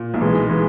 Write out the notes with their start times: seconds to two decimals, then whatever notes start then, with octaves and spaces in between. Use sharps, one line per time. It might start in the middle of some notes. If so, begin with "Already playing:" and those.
Already playing: A#2
0.14 B1
0.21 E3 G#3
0.35 D#4
0.49 E3 G#3